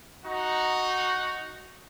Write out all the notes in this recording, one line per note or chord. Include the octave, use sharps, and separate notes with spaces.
D#4 F#4